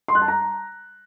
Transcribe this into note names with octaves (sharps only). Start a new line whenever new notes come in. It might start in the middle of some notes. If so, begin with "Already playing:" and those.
C6
F#6
A5
A#5